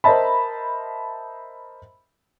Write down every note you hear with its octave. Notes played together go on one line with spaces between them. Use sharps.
A#4 C5 D#5 E5 A5 B5